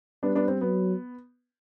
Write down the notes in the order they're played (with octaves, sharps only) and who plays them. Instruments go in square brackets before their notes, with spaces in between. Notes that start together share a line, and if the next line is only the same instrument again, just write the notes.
[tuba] G3 [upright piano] B3 D4
[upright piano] B3 D4
C4
[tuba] F#3 [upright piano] B3